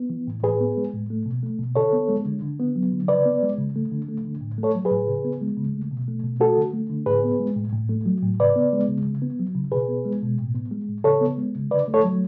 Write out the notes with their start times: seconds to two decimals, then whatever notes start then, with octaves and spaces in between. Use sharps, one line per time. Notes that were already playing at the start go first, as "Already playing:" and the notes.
Already playing: B3
0.10 E3
0.27 A2
0.43 A2 G#4 B4
0.61 B3
0.77 G#3
0.94 A2
1.10 A3
1.26 B2
1.43 A3
1.59 B2
1.76 D3 A4 C#5
1.93 B3
2.09 G#3
2.26 D3
2.42 D3
2.60 B3
2.76 F#3
2.92 D3
3.08 C#3 B4 D5
3.26 B3
3.43 G#3
3.58 C#3
3.76 A3
3.91 D3
4.09 A3
4.25 D3
4.41 A2
4.58 A3
4.63 A4 C#5
4.75 F#3
4.85 G#4 B4
4.91 A2
5.08 C#3
5.24 B3
5.41 G#3
5.57 C#3
5.74 A3
5.91 B2
6.08 A3
6.24 B2
6.40 A3 F#4 A4
6.58 D3
6.73 A3
6.90 D3
7.06 A2 G#4 B4
7.24 B3
7.40 G#3
7.56 A2
7.73 A2
7.89 A3
8.06 F#3
8.23 A2
8.39 C#3 B4 D5
8.56 B3
8.73 G#3
8.89 C#3
9.05 C#3
9.22 B3
9.40 F#3
9.55 C#3
9.72 B2 G#4 B4
9.88 B3
10.05 G#3
10.23 B2
10.39 A2
10.55 B3
10.71 G#3
10.89 A2
11.04 C#3 A4 C#5
11.21 B3
11.37 G#3
11.55 C#3
11.71 D3 B4 D5
11.88 A3
11.94 A4 C#5
12.04 F#3